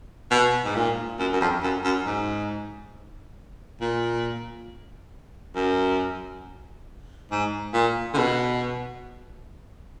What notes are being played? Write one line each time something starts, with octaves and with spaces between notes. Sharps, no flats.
B2
G#2
A#2
F#2
F#2
F2
F#2
F#2
G#2
A#2
F#2
G#2
A#2
D3
B2